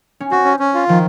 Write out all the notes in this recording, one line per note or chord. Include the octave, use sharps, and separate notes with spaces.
C#4
C4 F#4
C#4
C#4
F4
D#3 F3